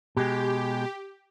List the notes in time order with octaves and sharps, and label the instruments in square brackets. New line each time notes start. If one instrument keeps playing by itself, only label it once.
[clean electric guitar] B2 G#3 [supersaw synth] G4